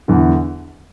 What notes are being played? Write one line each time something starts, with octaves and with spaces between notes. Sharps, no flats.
E2 D3